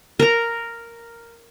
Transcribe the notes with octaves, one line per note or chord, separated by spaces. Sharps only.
A#4 A#5